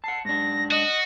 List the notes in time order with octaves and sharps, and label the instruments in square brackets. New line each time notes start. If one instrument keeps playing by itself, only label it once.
[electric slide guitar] F#5 A5 [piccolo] C7
[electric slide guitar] G#2 D4 [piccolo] A#6
[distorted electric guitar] F#4 [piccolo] D#5